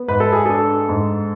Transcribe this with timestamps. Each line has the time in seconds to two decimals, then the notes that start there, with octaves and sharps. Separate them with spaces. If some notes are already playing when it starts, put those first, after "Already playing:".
Already playing: B3
0.08 G#2 B4
0.20 A4
0.32 G#4
0.46 D4 A4
0.89 G#2